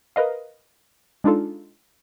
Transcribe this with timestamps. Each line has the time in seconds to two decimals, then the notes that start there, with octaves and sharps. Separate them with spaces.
0.16 A#4 B4 D#5 F5
1.24 G#3 D4 D#4 F4 A4